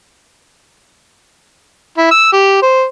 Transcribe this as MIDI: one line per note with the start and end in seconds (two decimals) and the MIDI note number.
1.98 2.10 64
2.11 2.32 88
2.33 2.60 67
2.62 2.84 72